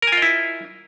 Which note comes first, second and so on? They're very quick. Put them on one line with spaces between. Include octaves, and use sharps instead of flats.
A#4 G#5 F4 D#5 E4